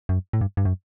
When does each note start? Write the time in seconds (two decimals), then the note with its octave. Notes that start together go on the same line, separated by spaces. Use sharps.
0.09 F#2
0.33 A2
0.41 G2
0.57 G2
0.65 F#2